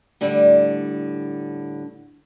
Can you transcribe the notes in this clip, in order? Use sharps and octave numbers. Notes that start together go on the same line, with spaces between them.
A2 D3 G3 D4